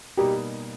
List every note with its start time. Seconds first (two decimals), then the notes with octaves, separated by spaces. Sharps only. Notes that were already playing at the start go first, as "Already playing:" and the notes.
0.17 B2 G3 A#3 D#4 G4